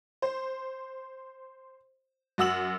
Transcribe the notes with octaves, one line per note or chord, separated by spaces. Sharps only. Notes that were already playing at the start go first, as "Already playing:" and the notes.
C5
F#2 F#4 E6 F#7